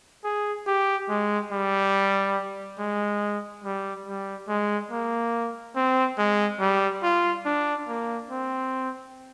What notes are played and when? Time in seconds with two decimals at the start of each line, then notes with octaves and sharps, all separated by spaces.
0.24 G#4
0.67 G4
1.09 G#3
1.52 G3
2.79 G#3
3.64 G3
4.06 G3
4.48 G#3
4.91 A#3
5.76 C4
6.18 G#3
6.60 G3
7.03 F4
7.46 D4
7.88 A#3
8.31 C4